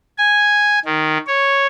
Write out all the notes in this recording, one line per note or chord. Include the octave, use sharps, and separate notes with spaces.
G#5
D#3
C#5